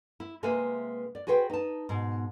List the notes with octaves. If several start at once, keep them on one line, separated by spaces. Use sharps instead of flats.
E4
C3 G#3 A#3 B4 E5 G#5
D5
F#4 G#4 B4 C5 F#5 G5
D#4 A5
G#2 B2